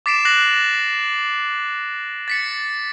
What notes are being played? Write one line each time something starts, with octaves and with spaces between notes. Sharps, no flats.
D6 A6 B6 C7 D7 E7
F#6 A6 A#6 C7 F#7
A6 B6 C#7